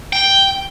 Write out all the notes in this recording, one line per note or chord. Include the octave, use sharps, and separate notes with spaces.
G5